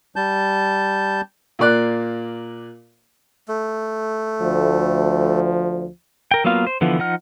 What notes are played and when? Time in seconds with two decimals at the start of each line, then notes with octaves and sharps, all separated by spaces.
0.16 G3 A5 G6
1.59 A#2 A#3 D5 F#6
3.48 A3
4.41 D2 F3
6.31 A#4 G5
6.44 F#3 A#3 B3 F4 F5
6.67 C5
6.81 D3 E3 F3 B3
6.99 F3 D#4 F#5 F6